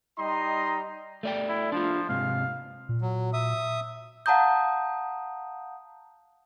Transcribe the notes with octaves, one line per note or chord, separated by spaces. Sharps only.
G3 D#4 D#5 G5 A#5 C6
A3 D5 G5
E4
F3 D4 F4
G#2 C3 F5
A#2
F#3
E5 D#6
F5 F#5 A5 A#5 D#6 G6